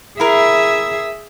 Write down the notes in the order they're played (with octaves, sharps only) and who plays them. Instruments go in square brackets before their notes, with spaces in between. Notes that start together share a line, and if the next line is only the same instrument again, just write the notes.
[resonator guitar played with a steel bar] E4 A#4 [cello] G#4 E5